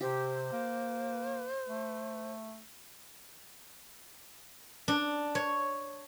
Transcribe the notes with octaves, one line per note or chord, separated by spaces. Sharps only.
C3 G4 C5
A#3
A3
D4
C#5